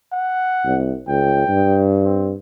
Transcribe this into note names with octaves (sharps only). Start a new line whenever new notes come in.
F#5
C2
C#2 G5
G2
C4